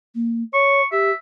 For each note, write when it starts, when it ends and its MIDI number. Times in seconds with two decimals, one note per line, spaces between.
0.15 0.43 58
0.53 0.81 73
0.53 0.85 85
0.92 1.11 67
0.92 1.14 76